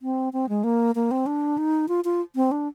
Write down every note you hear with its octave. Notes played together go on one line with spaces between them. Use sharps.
C4
C4
G#3
A#3
A#3
C4
D4
D#4
F4
F4
C4
D4